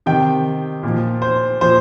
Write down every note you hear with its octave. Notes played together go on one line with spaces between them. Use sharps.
C3 D#3 G5
A#2 F3
C5
A#2 F3 C5